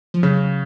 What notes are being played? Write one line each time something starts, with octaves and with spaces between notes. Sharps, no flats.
F3
C#3 F#3